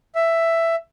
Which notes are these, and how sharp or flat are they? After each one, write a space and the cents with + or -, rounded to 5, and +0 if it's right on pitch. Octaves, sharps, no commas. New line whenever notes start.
E5 +10